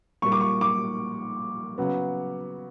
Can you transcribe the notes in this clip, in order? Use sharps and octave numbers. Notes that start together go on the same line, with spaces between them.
A#2 G3 A#3 C#6
D6
C#6
D6
C#3 F#3 B3